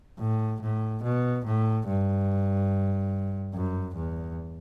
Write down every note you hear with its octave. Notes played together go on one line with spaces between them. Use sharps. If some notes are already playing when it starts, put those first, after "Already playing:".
A2
A2
B2
A2
G2
F#2
E2